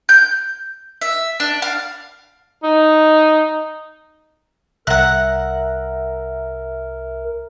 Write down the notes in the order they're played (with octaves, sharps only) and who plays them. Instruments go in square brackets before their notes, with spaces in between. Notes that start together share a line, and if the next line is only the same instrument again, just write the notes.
[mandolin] G6
E5
D4
F5
[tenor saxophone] D#4
[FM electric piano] C2 E5 A#5 [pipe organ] A#4 [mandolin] F#5 F#6